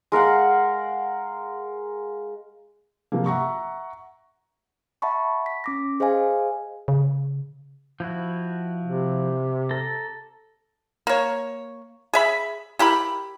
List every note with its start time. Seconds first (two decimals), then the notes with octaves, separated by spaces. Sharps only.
0.12 G#3 A#4 F5 F#5
3.12 C3 F3 A#3
3.26 E5 F#5 A#5 C#6
5.02 E5 F#5 A5 B5 C#6
5.46 B6
5.64 C#4 D6 A#6
6.00 G#4 C5 D#5 F5 G#5
6.88 C#3
8.00 F3 E4 F#4
8.83 C3
9.71 A4 A#5
11.07 A#3 C#5
12.13 G#4 E5 B5
12.79 E4 G4 A#4 B5